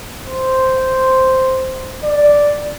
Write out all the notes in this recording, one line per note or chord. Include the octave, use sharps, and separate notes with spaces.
C5
D5